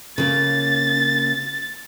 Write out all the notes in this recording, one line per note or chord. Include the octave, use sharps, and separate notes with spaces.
C#3 A#3 A6